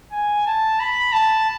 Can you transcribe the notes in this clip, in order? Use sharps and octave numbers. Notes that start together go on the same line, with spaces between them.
G#5
A5
B5
A5